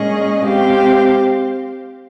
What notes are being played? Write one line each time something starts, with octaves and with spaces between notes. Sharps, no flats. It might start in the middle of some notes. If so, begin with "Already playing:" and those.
Already playing: A#2 G#3 C#4 G#4 D#5
G#3 C4 G4 C5 F5